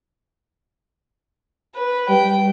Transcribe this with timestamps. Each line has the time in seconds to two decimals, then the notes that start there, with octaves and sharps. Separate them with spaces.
1.75 B4
2.09 G3 G5